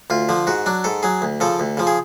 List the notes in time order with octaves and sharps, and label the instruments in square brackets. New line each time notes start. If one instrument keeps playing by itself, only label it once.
[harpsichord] D2 F4
D3 F3
G#2 F#4
F#3 D4
G#2 A4
F#3 G#4
D2
C#3 F3 A4
D2
C#3 F3
G#4